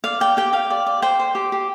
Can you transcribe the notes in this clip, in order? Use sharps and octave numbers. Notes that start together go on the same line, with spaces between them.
D5 F5
D5 G5
G4 G5
G4 F5
D5
D5
C5 G5
C5
G4
G4